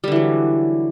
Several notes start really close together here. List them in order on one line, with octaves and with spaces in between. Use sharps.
G3 D3 E3 F#3